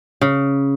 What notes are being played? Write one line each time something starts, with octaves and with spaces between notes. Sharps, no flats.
C#3